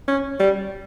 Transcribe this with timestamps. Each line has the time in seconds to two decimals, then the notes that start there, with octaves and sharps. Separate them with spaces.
0.08 C#4
0.40 G3